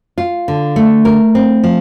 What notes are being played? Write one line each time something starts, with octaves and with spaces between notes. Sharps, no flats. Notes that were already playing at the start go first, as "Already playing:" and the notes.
F4
D3
A3
A#4
C4
F3